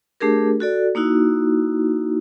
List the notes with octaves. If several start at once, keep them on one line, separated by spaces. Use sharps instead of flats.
A3 D4 G4 G#4 A#4
F#4 A4 D5
A#3 D#4 E4 F#4